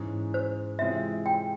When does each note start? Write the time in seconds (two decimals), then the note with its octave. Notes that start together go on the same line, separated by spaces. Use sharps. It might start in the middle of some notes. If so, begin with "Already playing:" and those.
Already playing: G#2 E3 G#3 C#4
0.34 C5
0.79 C3 E3 G#3 C4 F4 E5
1.26 G5